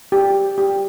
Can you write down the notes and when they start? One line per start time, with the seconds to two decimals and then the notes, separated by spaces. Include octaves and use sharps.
0.12 G4
0.58 G4